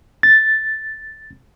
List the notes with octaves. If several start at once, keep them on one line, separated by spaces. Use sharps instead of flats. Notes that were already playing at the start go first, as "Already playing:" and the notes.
A6